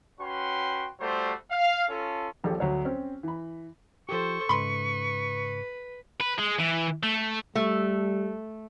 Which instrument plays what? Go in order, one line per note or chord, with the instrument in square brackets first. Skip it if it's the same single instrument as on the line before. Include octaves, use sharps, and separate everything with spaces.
[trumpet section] C#4 F#4 B4 G5 C6
G3 A3 F#4 C5
F5
C#4 F4 A4
[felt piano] D#1 A#1 G4 A4
D2 F#3 C#5
C4 C#4
E3 B5
[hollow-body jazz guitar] F3 G4 [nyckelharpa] A4 C5 [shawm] C#6
[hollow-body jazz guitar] G#2 C#3 [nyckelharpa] B4 [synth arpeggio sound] B5 C6
[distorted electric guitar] B4
G#3
E3
A3
[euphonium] G3 [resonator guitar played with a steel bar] A3